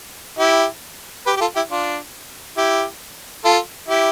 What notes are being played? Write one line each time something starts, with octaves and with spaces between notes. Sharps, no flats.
E4 G4
G4 B4
G4
F4 A4
E4 G4
D4 F4
E4 G4
F4 A4
E4 G4